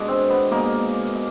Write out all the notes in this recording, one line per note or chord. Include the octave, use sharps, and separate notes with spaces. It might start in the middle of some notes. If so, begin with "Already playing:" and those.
Already playing: B2 G#3 D4
C4
B3
B2 G#3 A#3
B2